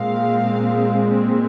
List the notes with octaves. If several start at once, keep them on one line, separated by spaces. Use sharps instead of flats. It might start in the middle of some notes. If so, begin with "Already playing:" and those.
Already playing: A#2 G#3 C4 F5